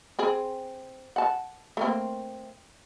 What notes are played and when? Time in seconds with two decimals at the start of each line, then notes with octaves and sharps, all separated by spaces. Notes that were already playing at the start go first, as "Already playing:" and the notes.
0.19 C4 G#4
1.16 F#5 A5
1.77 A3 A#3 C4